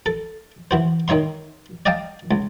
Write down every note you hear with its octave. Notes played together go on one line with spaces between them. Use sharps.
A4
E3 F#4 C5
D#3 D#4 C#5 E5 C6
D5 D#5 F5 G5 A5
C#2